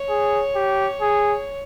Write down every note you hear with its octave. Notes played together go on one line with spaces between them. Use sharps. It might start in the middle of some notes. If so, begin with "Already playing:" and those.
Already playing: C#5
G#4
G4
G#4